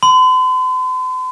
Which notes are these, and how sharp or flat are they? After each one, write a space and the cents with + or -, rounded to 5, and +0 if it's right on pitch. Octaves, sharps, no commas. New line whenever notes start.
C6 -45